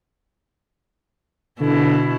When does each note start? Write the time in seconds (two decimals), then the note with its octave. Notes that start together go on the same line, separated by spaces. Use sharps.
1.60 B2 D3 E4